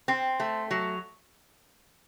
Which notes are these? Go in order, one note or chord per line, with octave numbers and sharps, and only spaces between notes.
C4
A3
F#3